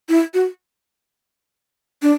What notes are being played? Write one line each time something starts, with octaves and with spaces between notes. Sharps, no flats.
E4
F#4
D4